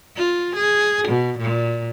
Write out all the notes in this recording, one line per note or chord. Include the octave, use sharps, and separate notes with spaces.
F4
G#4
B2
A#2